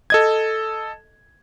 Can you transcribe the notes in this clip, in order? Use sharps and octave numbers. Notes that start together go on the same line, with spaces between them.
A4 D#5 G#6